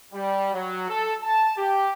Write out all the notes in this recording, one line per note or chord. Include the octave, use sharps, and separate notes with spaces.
G3
F#3
A4
A5
G4